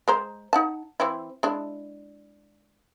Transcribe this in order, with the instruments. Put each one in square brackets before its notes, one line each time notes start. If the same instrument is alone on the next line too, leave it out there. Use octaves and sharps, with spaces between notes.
[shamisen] G#3 C5 A#5
D#4 F#5 A5
E3 C4 E4
G#3 D4 E4